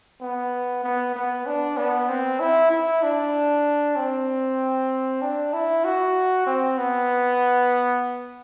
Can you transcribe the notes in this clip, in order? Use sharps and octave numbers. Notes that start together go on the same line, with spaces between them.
B3
B3
B3
D4
B3
C4
E4
E4
D4
C4
D4
E4
F#4
C4
B3